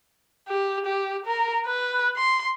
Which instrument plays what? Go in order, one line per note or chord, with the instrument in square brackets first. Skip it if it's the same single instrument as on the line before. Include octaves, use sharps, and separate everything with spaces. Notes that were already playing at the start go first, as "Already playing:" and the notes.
[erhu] G4
G4
A#4
B4
C6